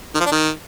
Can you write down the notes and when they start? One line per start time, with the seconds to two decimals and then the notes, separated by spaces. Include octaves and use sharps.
0.15 D#3
0.20 F3
0.26 D4
0.32 D#3